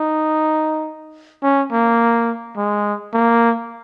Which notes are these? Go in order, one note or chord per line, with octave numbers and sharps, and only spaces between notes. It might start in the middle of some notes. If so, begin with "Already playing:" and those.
Already playing: D#4
C#4
A#3
G#3
A#3